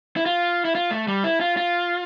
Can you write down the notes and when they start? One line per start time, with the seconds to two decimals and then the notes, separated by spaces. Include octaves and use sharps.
0.16 E4
0.26 F4
0.65 E4
0.75 F4
0.91 A3
1.08 G3
1.24 E4
1.41 F4
1.57 F4